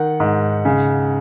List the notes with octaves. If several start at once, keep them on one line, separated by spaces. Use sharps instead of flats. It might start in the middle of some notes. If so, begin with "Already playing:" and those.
Already playing: D#3 F#5
G#2
C#3